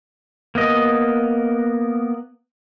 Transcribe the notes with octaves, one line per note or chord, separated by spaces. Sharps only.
A#3 B3 D#5